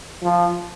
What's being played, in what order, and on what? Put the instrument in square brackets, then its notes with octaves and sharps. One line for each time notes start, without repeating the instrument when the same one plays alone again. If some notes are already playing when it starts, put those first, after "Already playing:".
[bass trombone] F3